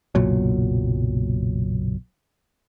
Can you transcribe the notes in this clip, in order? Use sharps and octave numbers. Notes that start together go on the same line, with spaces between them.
F#1 B1 A#2 F#3